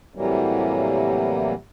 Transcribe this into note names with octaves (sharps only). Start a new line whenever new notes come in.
A2 C3 E3 F#3 G3 A#3